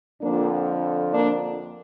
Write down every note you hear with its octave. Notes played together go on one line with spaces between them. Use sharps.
F2 D3 F3 A#3 D4
A#3 D4